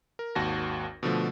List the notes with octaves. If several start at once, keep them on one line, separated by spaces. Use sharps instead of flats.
A#4
G#1 D#2 F#4 A5 A#6
B2 D3 F3 A3